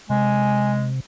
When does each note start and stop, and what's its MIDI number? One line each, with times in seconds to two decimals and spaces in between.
0.10 1.00 48
0.10 0.92 56
0.10 0.72 80